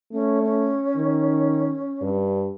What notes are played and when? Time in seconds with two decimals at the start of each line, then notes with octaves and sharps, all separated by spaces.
0.12 A3 C#4
0.44 C#4
0.96 D#3
2.02 G2